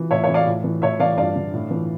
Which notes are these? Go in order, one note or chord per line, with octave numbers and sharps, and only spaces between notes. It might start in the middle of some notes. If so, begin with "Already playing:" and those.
Already playing: E3
A2 C#5 E5
E3 C#5 E5
D5 F5
A2
E3
A2 C#5 E5
E3 D5 F5
G2 D5 F5
D3
A2
E3